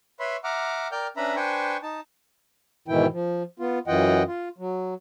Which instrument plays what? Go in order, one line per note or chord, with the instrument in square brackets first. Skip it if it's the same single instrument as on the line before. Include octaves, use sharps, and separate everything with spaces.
[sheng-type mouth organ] B4 C#5 E5 B5 C6
E5 F#5 A#5 D6 F6
A#4 D5 G5 F6 G6
C#4 D4 B4 E5 A#5 B5
D4 B4 C5 G5 G#5 C#6
D#4 A5
[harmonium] G#2 B2 D#3 E3 E4 G5
F3
B3 F4
F#2 E3 F4 D#5 F#5 G5
F4
F#3